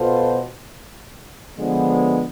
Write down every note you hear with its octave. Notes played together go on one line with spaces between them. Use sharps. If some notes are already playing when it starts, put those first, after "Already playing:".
Already playing: B2 B3 F4 A4 C5
D3 F3 G#3 B3